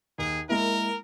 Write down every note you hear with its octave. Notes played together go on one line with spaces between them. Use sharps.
D#2 G#4
G#3 A#3 E4 A#4